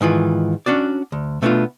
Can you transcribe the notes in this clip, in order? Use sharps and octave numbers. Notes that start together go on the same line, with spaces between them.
G#2 D#3 E3 F4
C#4 D4 F#4 D5
D2
B2 A3 B3 C#4 D4 F4